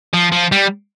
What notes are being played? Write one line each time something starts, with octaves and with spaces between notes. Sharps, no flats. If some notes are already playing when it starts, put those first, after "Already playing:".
F3
F3
G3